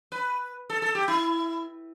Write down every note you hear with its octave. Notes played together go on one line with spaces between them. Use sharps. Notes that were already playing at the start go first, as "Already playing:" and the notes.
B4
A4
A4
G4
E4